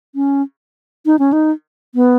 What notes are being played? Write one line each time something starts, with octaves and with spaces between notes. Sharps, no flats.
C#4
D#4
C#4
D#4
B3